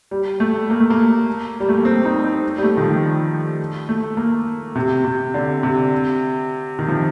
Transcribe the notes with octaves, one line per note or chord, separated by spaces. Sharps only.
G3
A3
A#3
A3
A#3
G3
A3
A#3
C4
D#4
C4
G3
A3
D#3
F3
A3
A#3
C3
C3
D3
C3
D#3
F3